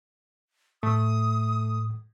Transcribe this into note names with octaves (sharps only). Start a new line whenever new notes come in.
A2 A3 D#6